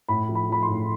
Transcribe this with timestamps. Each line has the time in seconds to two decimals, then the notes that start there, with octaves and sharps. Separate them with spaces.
0.09 A2 B5
0.29 F3
0.35 B5
0.49 F3 B5
0.63 C6
0.69 A2